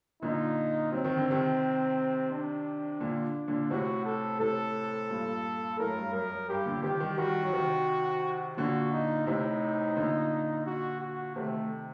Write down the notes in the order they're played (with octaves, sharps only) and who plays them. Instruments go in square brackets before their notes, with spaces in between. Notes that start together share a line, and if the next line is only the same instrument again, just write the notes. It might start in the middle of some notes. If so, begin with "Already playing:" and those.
[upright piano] A#2 D3 [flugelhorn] D#4
[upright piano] F#3 [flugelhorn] C4
[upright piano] D#3
D3
C3 D#3
[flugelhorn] D4
[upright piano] A#2 D3
A#2 D3
[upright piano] A2 C3 [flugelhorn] F#4
[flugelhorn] A4
[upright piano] A2 C3 [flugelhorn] A4
[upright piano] G2 A#2
[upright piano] F#2 A2 [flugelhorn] A#4
[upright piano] G2
[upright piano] F#2 [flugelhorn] A#4
[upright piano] F#2
[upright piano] G2 [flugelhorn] G4
[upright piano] A#2 D3
[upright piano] C3 D#3 [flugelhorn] G4
[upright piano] D#3 G3
[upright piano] D#3 G3 [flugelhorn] F#4
[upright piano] F#3
C3 D#3
[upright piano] A#2 D3 [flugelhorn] F#4
[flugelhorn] D#4
[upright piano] A2 C3 [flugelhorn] D#4
[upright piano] A#2 D3
[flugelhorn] F#4
F#4
[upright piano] C3 D#3 [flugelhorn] A3